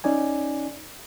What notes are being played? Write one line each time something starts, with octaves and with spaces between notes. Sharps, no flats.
C#4 D#4 D5 G#5